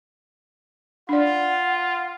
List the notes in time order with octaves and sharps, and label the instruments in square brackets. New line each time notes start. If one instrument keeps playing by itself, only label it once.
[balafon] D4 D5 [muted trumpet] F4 [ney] F#5